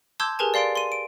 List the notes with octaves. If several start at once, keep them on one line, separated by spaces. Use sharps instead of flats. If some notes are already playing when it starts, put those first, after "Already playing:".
A5 C6 D6 E6 G6 G#6
G4 G#4 A#4 B4 G#5 A5
D5 F5 C6 A6 D7
C6 D#7
D7